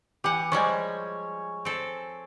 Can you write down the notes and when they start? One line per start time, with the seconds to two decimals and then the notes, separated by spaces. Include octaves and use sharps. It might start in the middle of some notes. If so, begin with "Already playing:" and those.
0.24 E3 G4 F#5
0.52 F3 G3 G#3 C#5 G#5
1.65 C4 A4